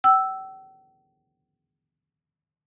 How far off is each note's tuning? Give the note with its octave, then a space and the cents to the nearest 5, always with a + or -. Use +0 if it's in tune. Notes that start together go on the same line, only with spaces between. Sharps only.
G5 -45 E6 +0